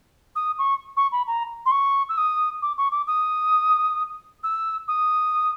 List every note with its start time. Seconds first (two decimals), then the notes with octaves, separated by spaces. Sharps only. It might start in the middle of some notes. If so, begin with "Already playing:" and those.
0.35 D#6
0.58 C#6
0.97 C#6
1.12 B5
1.27 A#5
1.65 C6
1.71 C#6
2.09 E6
2.17 D#6
2.62 D6
2.77 C#6
2.91 D6
3.07 D#6
4.43 E6
4.88 D#6